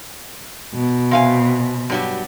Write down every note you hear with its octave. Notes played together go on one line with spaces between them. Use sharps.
B2
C3 F5 G#5
G2 F#3 G3